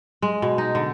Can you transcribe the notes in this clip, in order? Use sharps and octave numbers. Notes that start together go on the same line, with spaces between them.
G#3
B2
D#4
D3